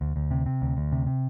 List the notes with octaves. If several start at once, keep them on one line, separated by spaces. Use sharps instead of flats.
D2
D2
C3
C3
D2
D2
C3
C3